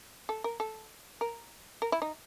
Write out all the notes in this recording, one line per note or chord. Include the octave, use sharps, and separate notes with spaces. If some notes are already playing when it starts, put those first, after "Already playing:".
A4
A#4
A4
A#4
A#4
E4
D#4